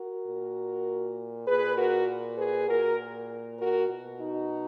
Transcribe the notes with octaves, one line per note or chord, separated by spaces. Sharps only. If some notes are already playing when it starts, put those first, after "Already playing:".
Already playing: F#4 A#4
A#2
A#2 G#4 B4
F#4 A#4
G#4 B4
A#2 F#4 A#4
F#4 A#4
B2
D#4 F#4